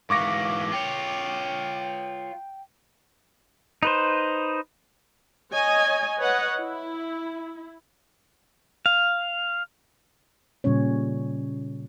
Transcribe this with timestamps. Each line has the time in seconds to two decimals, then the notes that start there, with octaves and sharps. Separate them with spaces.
0.10 G#2 E3 F5 C#6 D6 A#6
0.72 F4 C#5 G5
3.83 D#4 B4 C5
5.53 C#5 D#5 G#5
6.19 B4 C#5 D#5 F#5
6.58 E4
8.86 F5
10.64 A#2 C#3 G3 C#4 C#5